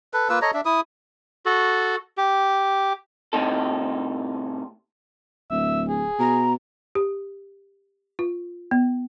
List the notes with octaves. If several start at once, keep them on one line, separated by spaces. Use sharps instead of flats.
A4 B4
A#3 F4 B4 E6
A4 C#5 D#5 A#5
D4 E5
E4 D#6
F#4 A4
G4
A2 C3 D#4 A4
D1 E5
G#4
B2 A#5
G4
F4
B3